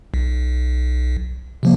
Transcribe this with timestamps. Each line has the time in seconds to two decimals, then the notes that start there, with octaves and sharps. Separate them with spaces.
0.14 B1
1.63 C3 F3 A#3